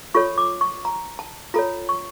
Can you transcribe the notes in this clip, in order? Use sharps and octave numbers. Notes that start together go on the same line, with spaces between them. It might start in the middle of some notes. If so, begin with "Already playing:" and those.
F4 A4 C#5 C#6
D6
C#6
A#5
A5
F4 A4 C#5 A#5
C#6